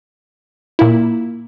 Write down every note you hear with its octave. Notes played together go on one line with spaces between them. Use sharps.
A#2 A#3 E4